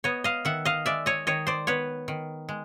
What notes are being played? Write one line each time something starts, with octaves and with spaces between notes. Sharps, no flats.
B3 C#5 D#5
D#5 F5
D#3 E5 F#5
D#5 F5
G#3 D5 E5
C#5 D#5
D#3 C#5 D#5
C5 D5
B3 B4 C#5
D#3
G#3